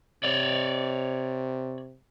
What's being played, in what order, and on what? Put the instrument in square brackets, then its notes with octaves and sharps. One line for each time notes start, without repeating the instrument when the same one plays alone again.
[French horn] C3 [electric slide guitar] C#5 D5